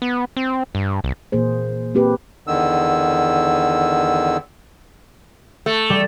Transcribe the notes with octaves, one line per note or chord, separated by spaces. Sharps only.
B3
C4
G2
C2
A#2 E3 A#3 G#4 C5
A#3 C4 G4 G#4 B4
E2 D3 D#3 E6
A3
G3